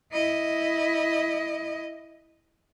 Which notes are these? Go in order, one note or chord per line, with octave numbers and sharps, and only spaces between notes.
E4 D#5